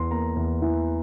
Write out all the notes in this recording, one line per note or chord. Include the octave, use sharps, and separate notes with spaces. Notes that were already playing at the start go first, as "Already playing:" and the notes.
Already playing: E2 E3 A#5 C6
A#3 A#5
E2
E3